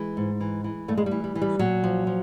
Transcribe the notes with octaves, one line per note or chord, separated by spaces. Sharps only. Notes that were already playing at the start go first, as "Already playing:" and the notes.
Already playing: E3 G#3
G#2
E3
E3
G2 A3
G#3
G3
E3
G3
E3
G3
A#2 F#3
F3
F3